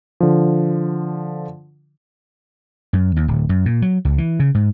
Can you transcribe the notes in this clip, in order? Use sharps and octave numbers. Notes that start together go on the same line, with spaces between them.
D3 F3
F#2
D#2
D1
F#2
A#2
F#3
C#2
E3
C#3
G#2